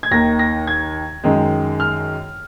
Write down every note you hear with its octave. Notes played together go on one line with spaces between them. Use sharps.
G#6
D#2 D#3 A#3 A#6
A#6
G#6
F#2 D#3 G#3
F6